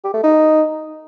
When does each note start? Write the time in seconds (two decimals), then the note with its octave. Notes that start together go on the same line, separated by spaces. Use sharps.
0.04 G4
0.14 A3
0.23 D#4